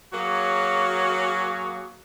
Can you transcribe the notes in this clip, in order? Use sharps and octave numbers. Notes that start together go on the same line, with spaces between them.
F#3 A#3 F#4 G#4 C#5